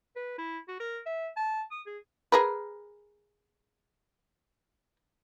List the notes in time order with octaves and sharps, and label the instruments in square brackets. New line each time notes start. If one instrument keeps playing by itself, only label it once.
[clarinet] B4
E4
F#4
A#4
E5
A5
D#6
G#4
[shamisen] G#4 A#4 B4